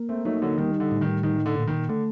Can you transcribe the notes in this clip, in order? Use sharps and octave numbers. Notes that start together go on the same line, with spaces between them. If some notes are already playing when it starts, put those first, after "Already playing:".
Already playing: A#3
A3 C4
F#3 A3 D#4
D3 F#3
D#3 G3
D3
A2
D#3
D#3 D#4
D3
A#2
D#3
D3 A3